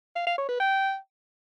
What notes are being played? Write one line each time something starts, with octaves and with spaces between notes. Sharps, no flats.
F5
F5
C#5
B4
G5